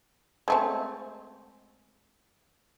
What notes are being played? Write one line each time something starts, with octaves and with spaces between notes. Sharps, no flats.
G#3 A3 C4